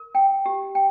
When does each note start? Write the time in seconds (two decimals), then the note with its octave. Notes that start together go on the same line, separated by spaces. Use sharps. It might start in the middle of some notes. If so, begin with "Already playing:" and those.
Already playing: A#4
0.15 G5
0.46 G4
0.75 G5